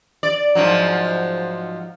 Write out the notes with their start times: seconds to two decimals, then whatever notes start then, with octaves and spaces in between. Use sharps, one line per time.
0.23 D5
0.55 G#2 F3 F#3